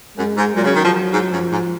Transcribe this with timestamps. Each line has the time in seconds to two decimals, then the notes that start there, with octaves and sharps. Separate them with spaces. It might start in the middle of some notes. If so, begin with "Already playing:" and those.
0.18 F#2 G#3
0.36 G#2
0.56 A#2 F#3
0.65 C#3
0.75 D#3
0.84 F3
1.13 G#2
1.32 F#2 F3
1.51 G#2